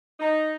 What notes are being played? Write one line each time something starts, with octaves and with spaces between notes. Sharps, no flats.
D#4